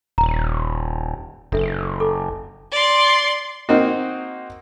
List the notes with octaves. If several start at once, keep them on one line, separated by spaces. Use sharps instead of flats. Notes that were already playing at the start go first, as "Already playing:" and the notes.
D#1 A#5
F#1 D4 A4 E5
A4 D6
D5 C6
A#3 C4 D#4 F#4